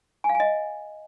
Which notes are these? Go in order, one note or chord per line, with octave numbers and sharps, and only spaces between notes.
G#5
F5
G#5
D#5